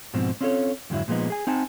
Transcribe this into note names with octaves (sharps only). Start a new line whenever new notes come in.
G#2 B2 F3 C4
C4 C#4 F4 G4 A4 C#5
F2 G#2 D3 F3 F#3 E4
A#2 F3 G#3 B3 D#4
G#4 G#5
C4 D#4 F#5 G#5 A5